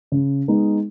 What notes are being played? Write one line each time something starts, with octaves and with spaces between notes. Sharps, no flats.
C#3
G#3 B3 D#4